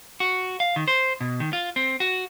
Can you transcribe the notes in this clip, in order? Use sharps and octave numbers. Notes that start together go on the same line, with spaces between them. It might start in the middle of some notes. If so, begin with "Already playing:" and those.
F#4
F5
D#3
C5
B2
D#3
F4
C4
F#4